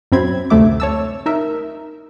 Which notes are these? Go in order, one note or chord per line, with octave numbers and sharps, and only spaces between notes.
F#2 C4 B5 G#6
D2 C3 A3 E5 D6
C#5 A5 E6
D#4 A#4 E5